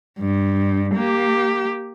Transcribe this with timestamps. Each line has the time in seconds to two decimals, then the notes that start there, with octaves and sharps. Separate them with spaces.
0.19 G2
0.95 A#3 G4